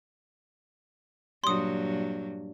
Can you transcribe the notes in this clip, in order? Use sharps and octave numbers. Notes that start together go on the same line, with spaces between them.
G2 A#2 F#3 C6 D#6